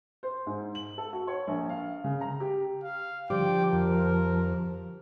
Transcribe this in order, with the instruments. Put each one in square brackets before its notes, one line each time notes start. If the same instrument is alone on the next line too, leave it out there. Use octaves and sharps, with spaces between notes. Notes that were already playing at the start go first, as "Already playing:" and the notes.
[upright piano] C5
G#2
F#7
A4
F#4
C#5
A#1
F5
C#3
A#5
G4
[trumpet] F5
[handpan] D3 G3 G4 [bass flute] F3 [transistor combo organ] C5 D5 D6 [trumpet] G5
[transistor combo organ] F2 [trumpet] A#4